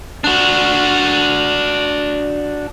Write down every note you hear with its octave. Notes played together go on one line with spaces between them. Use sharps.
D4 F#4